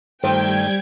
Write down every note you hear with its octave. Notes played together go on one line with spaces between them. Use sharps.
G2 D#3 G3 A3 C5 G5 G#6